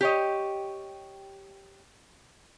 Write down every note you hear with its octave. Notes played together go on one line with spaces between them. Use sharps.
G4 C#5 D#5